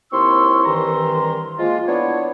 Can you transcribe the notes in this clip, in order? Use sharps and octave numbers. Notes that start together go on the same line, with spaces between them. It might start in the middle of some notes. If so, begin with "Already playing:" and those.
D#2 C4 E4 C6 C#6 E6
C2 G2 D#3 E3 A#5 C6
F3 G#3 A#3 F4
B3 D4 E4 C#5